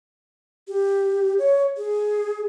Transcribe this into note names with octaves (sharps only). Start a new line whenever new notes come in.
G4
C#5
G#4